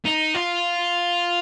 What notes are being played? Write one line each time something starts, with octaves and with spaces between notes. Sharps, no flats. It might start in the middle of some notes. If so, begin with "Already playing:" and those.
D#4
F4